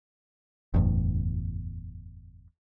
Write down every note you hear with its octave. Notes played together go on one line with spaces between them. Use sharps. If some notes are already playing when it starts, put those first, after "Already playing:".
F#1 E2 A2